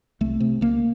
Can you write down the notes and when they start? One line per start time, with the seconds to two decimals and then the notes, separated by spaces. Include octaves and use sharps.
0.21 C2 A3
0.40 C3
0.61 C#2 A#3